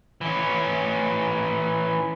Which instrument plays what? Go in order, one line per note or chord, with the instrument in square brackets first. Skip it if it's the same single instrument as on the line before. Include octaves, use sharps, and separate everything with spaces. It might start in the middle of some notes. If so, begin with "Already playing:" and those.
[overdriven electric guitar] E3 C#4